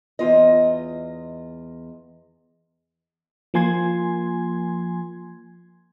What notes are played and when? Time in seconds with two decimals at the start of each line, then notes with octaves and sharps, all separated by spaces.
0.19 E2 F4 D#5
3.54 F3 A#3 G#5 C6 G#6